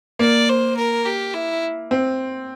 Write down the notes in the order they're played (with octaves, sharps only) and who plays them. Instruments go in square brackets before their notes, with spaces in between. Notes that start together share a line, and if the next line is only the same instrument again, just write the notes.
[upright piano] A#3 [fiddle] D5
[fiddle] C5
A#4
G4
E4
[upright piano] C4